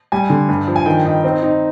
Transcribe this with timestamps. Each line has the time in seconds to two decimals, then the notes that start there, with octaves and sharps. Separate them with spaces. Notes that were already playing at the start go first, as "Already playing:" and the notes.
0.12 G3 G#5
0.30 D3
0.48 G2
0.68 F3
0.76 G#5
0.86 D#3 G5
1.05 D#4
1.24 C4
1.43 D#4